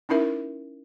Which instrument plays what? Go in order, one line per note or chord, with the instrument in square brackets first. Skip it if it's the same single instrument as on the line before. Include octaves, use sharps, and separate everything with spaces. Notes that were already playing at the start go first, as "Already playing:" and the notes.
[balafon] C#4 D#4 E4 A#4 E5